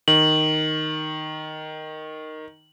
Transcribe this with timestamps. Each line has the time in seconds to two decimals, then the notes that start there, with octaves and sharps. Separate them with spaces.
0.08 D#3 F#7